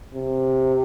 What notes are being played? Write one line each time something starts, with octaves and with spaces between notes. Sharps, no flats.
C3